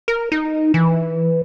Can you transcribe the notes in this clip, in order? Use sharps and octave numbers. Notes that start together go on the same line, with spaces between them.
A#4
D#4
E3